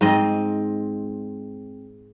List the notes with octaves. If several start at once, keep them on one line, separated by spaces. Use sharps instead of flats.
G#2 C4 D#5